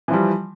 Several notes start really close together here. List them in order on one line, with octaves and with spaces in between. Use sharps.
E3 F3 G3